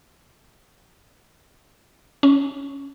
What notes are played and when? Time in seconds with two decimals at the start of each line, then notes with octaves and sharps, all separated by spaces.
2.23 C#4